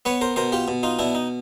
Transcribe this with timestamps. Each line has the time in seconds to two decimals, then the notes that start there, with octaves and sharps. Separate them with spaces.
0.05 B3 B4 C#5
0.21 A#4 C5
0.36 B2 A#4 C5
0.52 F4 G4
0.68 B2
0.83 D#4 F4
0.99 B2 D4 E4
1.15 D#4